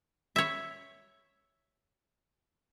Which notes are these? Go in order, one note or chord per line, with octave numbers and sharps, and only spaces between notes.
C#5 E5